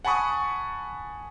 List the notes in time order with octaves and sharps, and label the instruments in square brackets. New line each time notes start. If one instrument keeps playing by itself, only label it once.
[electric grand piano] F#5 G#5 A5 B5 C#6 D#6